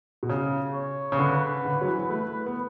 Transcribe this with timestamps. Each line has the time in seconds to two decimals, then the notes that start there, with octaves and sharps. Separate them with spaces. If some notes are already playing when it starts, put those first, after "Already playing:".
0.23 B2
0.30 C#3
0.74 C#5
1.12 C#3
1.19 D3 B4
1.65 D3
1.81 F#3
1.87 E3
2.10 A3 B4
2.46 B3